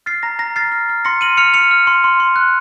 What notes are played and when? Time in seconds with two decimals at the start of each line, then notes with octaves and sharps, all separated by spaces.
0.06 F6 A6 C7
0.23 A#5 A#6
0.39 A#5 A#6
0.56 F6 A6 C7
0.72 F6
0.89 F6
1.05 C6 A#6 C#7
1.21 F6 D#7 F#7
1.37 F6 C#7 F7
1.54 F6 C#7 F7
1.71 F6
1.87 C6
2.04 C6
2.20 C6
2.36 F#6